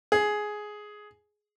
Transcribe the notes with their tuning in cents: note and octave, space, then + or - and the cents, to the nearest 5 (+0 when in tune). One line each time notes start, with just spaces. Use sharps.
G#4 +10